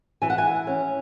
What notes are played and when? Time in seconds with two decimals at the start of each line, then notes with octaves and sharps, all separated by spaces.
0.22 E3 G#5
0.30 F#5
0.38 G#5
0.67 C#4